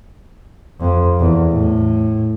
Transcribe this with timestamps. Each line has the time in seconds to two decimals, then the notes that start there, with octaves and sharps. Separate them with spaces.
0.80 F2
1.20 E2
1.51 A2